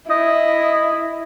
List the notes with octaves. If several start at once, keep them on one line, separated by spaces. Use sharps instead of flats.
E4 D#5